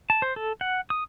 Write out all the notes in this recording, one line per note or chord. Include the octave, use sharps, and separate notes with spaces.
A5
C5
A4
F#5
D#6